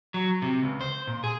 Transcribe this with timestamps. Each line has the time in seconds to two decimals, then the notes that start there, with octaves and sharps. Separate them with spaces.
0.14 F#3
0.42 C3
0.63 C#2
0.81 C5
1.07 A#2
1.24 G#4